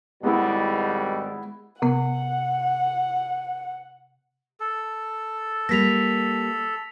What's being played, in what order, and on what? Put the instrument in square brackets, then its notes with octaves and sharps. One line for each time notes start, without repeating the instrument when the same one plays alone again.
[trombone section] G#1 B2 G3 [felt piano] G#3 B3 E4
[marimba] C3 B3 [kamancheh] F#5
[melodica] A4
[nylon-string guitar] G3 A#3 [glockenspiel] A#6 B6 F7